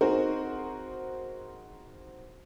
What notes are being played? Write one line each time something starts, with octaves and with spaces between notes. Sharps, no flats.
C4 D#4 F#4 G#4 A#4 C5